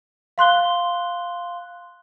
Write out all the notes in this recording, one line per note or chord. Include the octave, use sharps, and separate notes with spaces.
F5 C6 F#6 G7